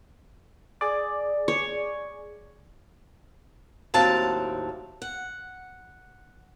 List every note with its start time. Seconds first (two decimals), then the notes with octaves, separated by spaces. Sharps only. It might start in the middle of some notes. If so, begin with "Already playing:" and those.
0.81 G#4 D5
1.48 C#5
3.94 D#2 A2 F#3 C4 F5 A5
5.02 F#5